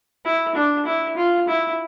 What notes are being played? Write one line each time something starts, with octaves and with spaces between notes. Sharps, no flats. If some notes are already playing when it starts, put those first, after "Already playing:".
E4
D4
E4
F4
E4